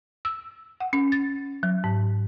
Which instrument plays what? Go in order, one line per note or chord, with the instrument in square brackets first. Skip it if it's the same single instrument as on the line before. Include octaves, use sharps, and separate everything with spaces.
[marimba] E6
F#5
C#4
A6
F#3
G#2